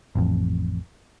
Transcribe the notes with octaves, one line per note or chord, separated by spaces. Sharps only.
A1 F2